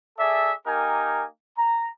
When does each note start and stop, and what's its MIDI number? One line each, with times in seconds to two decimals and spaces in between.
0.18 0.51 68
0.18 0.51 69
0.18 0.51 74
0.18 0.51 76
0.66 1.25 58
0.66 1.25 63
0.66 1.25 67
0.66 1.25 70
0.66 1.25 80
1.57 1.88 82